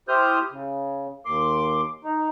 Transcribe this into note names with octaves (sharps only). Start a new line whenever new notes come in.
E4 G4 C5 D#6 F6 G6
C#3
D#2 C6 D6
D#4